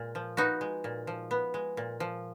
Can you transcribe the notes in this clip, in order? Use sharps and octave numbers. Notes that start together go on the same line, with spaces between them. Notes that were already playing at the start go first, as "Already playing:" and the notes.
Already playing: A#2 G#3
F3
B3 D#4 F#4
G#3
A#2
F3
B3
G#3
A#2
F3